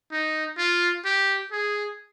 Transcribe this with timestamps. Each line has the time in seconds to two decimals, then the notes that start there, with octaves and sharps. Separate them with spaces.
0.12 D#4
0.58 F4
1.05 G4
1.52 G#4